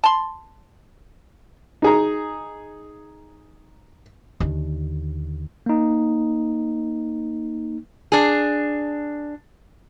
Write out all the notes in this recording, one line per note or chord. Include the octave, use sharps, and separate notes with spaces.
A5 C6
D#4 G#4 A#5
D#2 D3
A#3 D#4
D4 G#4